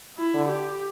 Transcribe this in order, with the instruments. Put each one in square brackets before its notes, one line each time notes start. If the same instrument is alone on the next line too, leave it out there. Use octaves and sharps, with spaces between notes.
[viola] E4
[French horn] D3
[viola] G4